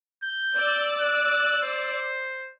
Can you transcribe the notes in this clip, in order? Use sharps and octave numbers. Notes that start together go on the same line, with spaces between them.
G6
D5 E6
F#6
C5